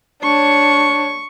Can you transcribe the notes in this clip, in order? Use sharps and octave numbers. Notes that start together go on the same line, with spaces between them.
D4 C#5 C#6